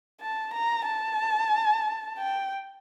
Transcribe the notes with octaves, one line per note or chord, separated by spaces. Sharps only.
A5
A#5
A5
G5